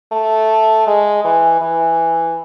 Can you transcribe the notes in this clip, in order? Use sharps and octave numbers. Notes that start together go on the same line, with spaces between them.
A3
G#3
E3
E3